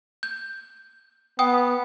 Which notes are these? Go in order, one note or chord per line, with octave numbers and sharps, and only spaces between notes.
G6
B3 F#5 G5 D#6